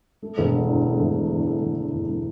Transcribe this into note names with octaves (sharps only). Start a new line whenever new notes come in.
A3
E1
D3
E2
A3
E1
D3
E2
A3
E1
D3
E2
A3